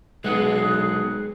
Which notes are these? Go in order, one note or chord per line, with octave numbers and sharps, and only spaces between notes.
B1 G#3 B3 G#4 F#6